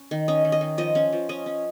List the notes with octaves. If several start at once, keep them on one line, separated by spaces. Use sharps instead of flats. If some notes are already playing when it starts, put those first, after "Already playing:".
Already playing: C#4
D#3
C#4 D#5
D#3
D#5
D#3
F3 D#5
C#4
F3
C#4 D#5
C#4